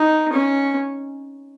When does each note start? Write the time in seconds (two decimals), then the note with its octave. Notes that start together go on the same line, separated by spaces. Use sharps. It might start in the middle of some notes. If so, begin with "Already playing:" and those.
Already playing: D#4
0.32 C#4